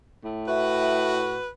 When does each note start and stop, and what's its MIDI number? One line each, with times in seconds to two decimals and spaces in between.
0.24 1.42 45
0.48 1.46 66
0.48 1.48 71
0.48 1.14 76